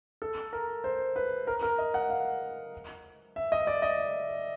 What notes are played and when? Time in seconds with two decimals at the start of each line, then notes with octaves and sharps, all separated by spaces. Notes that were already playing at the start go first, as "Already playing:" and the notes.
0.22 A4
0.53 A#4
0.84 C5
1.16 B4
1.47 A#4
1.62 A#4
1.78 D#5
1.94 F#5
2.10 F5
3.36 E5
3.52 D#5
3.67 D5
3.82 D#5